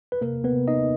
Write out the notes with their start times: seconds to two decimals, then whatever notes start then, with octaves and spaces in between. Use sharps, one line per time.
0.12 B4
0.21 C3 A#3 A#4
0.44 B3 B4
0.52 C3
0.68 D#4 D#5